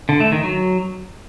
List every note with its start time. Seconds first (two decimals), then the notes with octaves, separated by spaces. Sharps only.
0.09 D3
0.20 A3
0.32 D#3
0.44 F#3